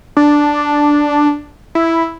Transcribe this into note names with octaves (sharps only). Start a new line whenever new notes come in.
D4
E4